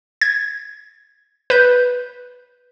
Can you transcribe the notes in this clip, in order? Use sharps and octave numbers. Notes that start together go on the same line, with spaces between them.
G#6
B4 G6